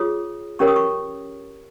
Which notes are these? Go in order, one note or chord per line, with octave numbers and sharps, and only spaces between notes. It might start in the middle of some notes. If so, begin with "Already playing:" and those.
Already playing: F4 G#4 C#5 D#6
C#4 G4 A#4 C#5 C#6
D#6
C#6